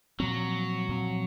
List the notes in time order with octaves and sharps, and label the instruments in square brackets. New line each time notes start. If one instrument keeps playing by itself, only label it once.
[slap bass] A#2 F3 C4 [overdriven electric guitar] F#3
[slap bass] A#2 F3 C4